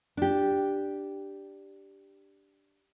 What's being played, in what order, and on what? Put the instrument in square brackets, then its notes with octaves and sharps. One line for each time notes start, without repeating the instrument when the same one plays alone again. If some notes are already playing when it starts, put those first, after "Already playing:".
[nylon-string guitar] D4 G4